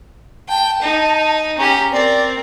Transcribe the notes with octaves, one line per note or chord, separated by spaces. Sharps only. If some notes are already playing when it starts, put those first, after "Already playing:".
G5 A5
D#4
C#4 G4 A#5
C4 A#4 D5